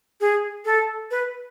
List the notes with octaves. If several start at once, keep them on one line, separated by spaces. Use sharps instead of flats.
G#4
A4
B4